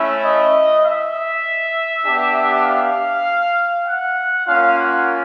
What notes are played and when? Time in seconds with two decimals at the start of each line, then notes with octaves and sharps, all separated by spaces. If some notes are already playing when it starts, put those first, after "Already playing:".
Already playing: A3 C#4 E4
0.23 D#5
0.84 E5
2.05 B3 D4 G4
2.65 F5
3.86 F#5
4.47 A#3 C#4 F4 F5
4.77 F#5